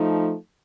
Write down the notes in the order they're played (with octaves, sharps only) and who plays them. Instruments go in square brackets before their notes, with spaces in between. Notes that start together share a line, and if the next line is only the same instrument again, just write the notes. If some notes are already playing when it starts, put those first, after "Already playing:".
Already playing: [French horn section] F3 A3 D#4